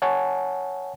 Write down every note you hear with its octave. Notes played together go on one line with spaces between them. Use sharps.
C#5 F#5 G#5 A5